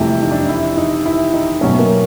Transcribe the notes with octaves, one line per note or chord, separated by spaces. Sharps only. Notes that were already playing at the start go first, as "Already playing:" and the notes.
Already playing: F2 C3 E3 F3 G3 A3
D#4
D4
D#4
E4
D#4
E4
D#4
B2 F#3 A3 C#4
A#3